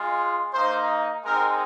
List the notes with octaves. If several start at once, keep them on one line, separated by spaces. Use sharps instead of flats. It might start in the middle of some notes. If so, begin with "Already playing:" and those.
Already playing: G#3 F4
A#3 D#4 C5
G#3 C4 D#4 A#4